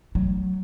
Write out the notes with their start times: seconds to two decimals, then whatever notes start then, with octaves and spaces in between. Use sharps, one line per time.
0.15 F#3